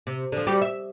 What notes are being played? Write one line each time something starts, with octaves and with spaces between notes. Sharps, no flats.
C3
D3 F3
G3 F#4 G4
E5